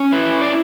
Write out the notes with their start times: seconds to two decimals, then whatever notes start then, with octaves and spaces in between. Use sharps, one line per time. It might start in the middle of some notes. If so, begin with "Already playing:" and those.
Already playing: C#4
0.12 E4 B4
0.42 D5